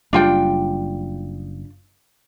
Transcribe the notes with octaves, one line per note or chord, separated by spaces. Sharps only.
F#1 G3 D4 F4 G5